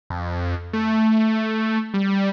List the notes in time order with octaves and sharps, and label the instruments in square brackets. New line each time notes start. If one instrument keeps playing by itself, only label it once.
[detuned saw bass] F2
A3
G3